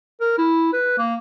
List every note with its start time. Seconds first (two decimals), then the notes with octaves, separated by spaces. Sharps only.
0.20 A#4
0.38 E4
0.73 B4
0.98 A#3